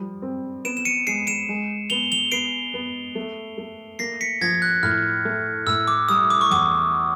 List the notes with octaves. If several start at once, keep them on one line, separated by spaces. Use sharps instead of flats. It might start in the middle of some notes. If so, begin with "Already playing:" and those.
Already playing: F3 G3
C4
B3 D7 E7
E7
C#7 D#7
G#3 C7 D7
D7 E7
G#3
B3 F7 G7
F7 G7
B3 C7 D7
B3
A3
A3
A#3 A#6 C7
B6 C#7
F3 G#6 A#6
F#6
A2 F6
A3
A2 E6
D6
G3 D#6
D6
C#6
E2 D6